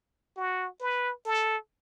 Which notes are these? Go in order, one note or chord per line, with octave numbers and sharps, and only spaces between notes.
F#4
B4
A4